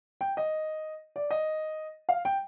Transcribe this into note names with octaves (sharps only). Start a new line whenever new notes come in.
G5
D#5
D5
D#5
F5
G5